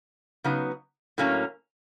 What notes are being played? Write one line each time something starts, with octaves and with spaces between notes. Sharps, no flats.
C#3 F#3 B3 D#4
A2 F#3 A#3 C#4